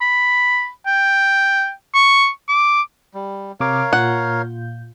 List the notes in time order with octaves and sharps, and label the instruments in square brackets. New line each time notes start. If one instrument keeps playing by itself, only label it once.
[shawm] B5
G5
C#6
D6
[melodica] G3
[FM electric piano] C3 D6 [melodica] A#4 C#5 F5
[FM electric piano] A#2 F4 G6 [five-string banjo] F#5